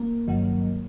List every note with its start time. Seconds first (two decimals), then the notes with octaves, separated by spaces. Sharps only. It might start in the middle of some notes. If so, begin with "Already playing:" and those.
Already playing: A#3
0.27 G1 G2 D#3 F#3